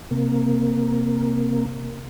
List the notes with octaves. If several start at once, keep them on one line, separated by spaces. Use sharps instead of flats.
C3 A#3